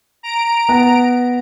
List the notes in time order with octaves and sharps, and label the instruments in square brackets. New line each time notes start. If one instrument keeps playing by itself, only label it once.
[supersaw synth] A#5 D7
[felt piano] B3